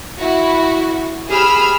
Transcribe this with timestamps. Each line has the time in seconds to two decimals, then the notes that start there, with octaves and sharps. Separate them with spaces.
0.18 E4 F#4
1.30 G4 G#4 B5 E6 F6